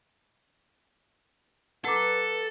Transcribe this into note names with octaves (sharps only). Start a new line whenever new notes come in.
A4 B4 F#5 A#5 D6